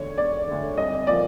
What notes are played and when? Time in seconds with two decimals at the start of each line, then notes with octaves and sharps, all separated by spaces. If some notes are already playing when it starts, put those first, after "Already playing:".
Already playing: E1 D2 D3 C#5
0.18 E1 D5
0.47 D2 D3
0.77 C2 D#5
1.07 A#2 F3 D5